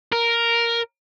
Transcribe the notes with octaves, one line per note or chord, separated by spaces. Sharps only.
A#4